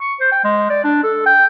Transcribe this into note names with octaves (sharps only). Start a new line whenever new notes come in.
C#6
C5
G5
G#3
D5
D4
A4
G5